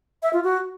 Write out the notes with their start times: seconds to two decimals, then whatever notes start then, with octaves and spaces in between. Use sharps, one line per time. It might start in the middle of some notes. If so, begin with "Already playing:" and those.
0.23 E5
0.33 F4
0.44 F#4